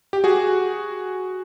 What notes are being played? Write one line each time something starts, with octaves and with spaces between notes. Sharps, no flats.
G4
F#4 G#4